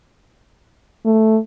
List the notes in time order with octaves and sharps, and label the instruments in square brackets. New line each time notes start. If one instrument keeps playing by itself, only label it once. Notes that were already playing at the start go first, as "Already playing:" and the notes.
[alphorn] A3